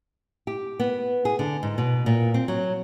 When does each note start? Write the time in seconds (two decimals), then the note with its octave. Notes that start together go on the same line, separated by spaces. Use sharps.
0.47 G4
0.80 B3
1.25 G#4
1.39 D3
1.63 G#2
1.78 B2
2.06 A#2
2.34 C4
2.48 F#3